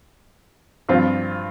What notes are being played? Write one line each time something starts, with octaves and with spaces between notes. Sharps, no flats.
G2 F3 C4 F4